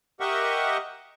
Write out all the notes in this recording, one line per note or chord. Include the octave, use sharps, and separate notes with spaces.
G4 A#4 D#5 E5 F#5 C#6